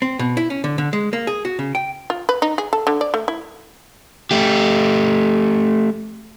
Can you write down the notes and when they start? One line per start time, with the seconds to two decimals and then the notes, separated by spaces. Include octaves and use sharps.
0.02 C4
0.19 B2
0.37 E4
0.50 C#4
0.64 D3
0.78 D3
0.93 G#3
1.13 A#3
1.27 G#4
1.45 F#4
1.59 C#3
1.75 G5
2.10 F4
2.29 B4
2.42 D#4
2.58 G#4
2.73 A4
2.87 D3
3.01 D5
3.14 A3
3.28 E4
4.31 A3 G4